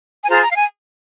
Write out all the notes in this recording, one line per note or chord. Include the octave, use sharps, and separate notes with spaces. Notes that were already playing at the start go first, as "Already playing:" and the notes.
G#5
F4 G#4 C5 A#5
A#5
F5
G#5